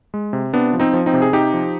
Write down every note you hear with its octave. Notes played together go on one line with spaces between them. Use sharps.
G#3
C3
C3 B3 D4
F3
C4 D#4
F3
C4 D#4
C3
G#4
C3 D#4 G4
F3